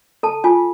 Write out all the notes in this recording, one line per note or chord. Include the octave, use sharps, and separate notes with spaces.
A4 A5
F4 G#5